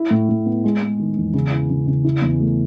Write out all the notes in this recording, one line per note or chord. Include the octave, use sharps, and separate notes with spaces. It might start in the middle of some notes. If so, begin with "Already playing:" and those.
Already playing: E4
A2
A2
B3
G#3
G#3
D#3
E2
C#3
E3
C#3
C#3
E4
E2
A3